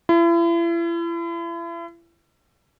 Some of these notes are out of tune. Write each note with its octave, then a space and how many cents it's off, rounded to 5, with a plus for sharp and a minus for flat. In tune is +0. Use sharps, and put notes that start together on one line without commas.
E4 +40